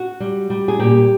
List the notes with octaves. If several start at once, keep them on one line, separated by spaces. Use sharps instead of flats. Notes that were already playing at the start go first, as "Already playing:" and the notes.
Already playing: F#4
G3
G3
G#4
A#2 G4